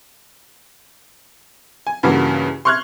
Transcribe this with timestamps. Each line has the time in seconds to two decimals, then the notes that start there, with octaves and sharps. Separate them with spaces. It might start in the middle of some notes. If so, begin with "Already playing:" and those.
1.87 G#5
2.03 G2 C#3 E3 A#3 F#4
2.65 C6 C#6 F6 F#6 G#6